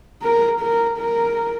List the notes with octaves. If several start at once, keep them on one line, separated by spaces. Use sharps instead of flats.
A#4
A#4
A#4